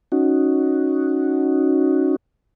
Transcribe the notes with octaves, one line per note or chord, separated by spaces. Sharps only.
C#4 D#4 F#4